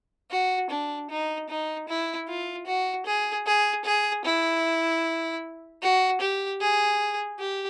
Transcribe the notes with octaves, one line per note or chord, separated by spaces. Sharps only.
F#4
D4
D#4
D#4
E4
F4
F#4
G#4
G#4
G#4
E4
F#4
G4
G#4
G4